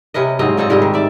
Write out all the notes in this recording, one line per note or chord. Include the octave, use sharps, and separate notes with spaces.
C3 C#4 B4 D#5
G#2 F#3 C4 D#5
A#2 C4 A4 D#5
G#2 G3 G4 D#5
D#3
D5 E5